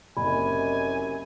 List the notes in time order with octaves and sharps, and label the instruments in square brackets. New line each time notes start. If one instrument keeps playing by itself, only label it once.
[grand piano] F#1 [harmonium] F#2 C3 [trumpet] G#5 [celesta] B5